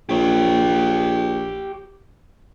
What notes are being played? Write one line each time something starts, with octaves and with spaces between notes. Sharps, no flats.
A#1 G4 C#5